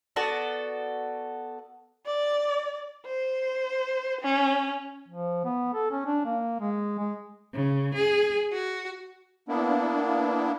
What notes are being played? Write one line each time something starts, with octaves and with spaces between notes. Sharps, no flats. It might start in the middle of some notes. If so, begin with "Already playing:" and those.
B3 F#4 A4 D5
D5
C5
C#4
F3
B3
A4
C#4
D4
A#3
G#3
G#3
C#3
G#4
F#4
A#3 B3 D4 E4